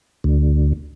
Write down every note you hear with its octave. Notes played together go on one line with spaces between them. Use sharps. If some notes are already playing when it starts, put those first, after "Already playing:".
D2